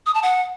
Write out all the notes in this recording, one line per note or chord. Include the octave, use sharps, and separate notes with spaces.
D#6
A5
F#5